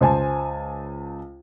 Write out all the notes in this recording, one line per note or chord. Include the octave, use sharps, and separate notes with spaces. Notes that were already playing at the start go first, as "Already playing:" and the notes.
C#2 C5 G#5 A5